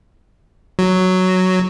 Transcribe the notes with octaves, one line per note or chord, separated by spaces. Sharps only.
F#3